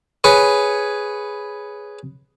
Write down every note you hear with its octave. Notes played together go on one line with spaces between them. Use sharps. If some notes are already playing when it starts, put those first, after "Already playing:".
G#4 B4 C#5